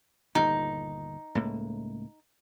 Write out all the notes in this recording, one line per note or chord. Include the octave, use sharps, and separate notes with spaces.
G1 D#2 A#2 D#4
C#2 A2 A#3